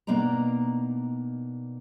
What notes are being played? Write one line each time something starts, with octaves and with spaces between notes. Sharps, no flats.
B2 A#3 D4 D#4 A#5